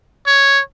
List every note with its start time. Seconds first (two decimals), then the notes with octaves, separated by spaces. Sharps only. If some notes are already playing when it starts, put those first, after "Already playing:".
0.27 C#5